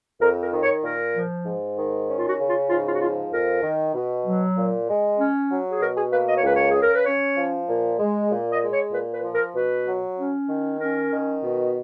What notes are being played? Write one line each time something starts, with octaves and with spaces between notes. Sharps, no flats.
F2 A#4
A#4
D#3
C#5
A#2 A#4
F3
G#2
D#3
C#4
F4
F#4
C#3
F4
G#2 F4
F4
F#4
F3 F4
F2 A#4
D#3
B2
F#3
A#2
G#3
C#4
F#3
G#4
B2 A#4
G#4
A#3 B4
D#5
C#5
C#2 B4
C#5
C#3 G#4
A#4
B4
C#4 C#5
F3
A#2
G#3
A#2
D#5
G#3
C#5
A#2 B4
B4
F3
A#4
B2 B4
F#3
C#4
D#3
C#4 A#4
D#3
B2